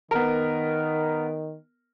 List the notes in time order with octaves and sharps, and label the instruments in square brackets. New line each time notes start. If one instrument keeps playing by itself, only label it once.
[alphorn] D#3 [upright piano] B3 A#4